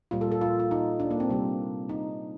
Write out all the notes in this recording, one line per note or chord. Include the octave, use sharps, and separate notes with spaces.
A#2 G3 A#3 F4
A4
A4
F4
F4
D#4
D4
A#3
C4
C3 G3 A#3
D#4